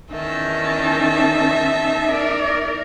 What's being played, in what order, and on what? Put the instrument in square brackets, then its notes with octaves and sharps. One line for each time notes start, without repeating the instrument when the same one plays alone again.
[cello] E2 D#4 [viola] D#3 [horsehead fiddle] C#4 A5 [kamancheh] E5
[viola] A#4 [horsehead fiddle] D5